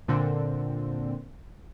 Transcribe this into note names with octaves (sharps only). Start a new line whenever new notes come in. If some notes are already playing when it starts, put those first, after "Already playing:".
A#2 D3 C4